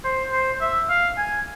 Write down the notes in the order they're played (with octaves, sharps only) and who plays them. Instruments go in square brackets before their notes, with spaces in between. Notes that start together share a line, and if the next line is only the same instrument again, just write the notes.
[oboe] C5
C5
E5
F5
G#5